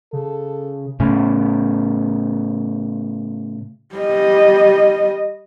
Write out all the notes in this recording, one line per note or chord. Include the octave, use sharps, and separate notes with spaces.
C#3 A4
A2 C#3
G3 D#5